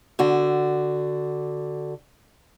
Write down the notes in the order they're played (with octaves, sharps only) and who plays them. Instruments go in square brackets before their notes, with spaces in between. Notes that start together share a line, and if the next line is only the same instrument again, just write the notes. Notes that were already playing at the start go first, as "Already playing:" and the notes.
[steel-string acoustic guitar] D3 F#4